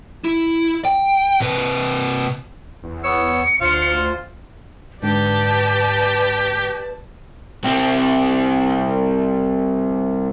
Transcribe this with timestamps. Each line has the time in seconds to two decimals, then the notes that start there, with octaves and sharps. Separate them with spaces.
0.24 E4
0.85 G5
1.40 C3 B4
2.84 E2
3.04 B3 C#5 E6 C#7
3.61 D2 F4 C5 F5
5.03 G#2 D3 G4 B4 D5 A5
7.63 C2 C4